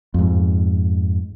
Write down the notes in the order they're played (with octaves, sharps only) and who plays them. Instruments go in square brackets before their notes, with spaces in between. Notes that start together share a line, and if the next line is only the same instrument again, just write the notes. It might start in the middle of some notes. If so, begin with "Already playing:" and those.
[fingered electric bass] F2 G#2